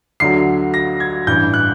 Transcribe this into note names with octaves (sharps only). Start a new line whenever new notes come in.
D2 D3 F#3 C7
A#6
G#6
A1 G2 E3 G6
F#6